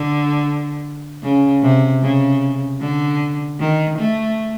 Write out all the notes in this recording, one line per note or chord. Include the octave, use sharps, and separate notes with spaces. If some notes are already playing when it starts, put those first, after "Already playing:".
Already playing: D3
C#3
C3
C#3
D3
D#3
A3